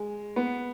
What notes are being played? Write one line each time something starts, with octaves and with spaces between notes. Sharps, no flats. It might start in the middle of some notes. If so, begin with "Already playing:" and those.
Already playing: G#3
B3